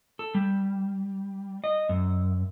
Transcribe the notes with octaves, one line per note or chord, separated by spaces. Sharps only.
A4
G3
D#5
F#2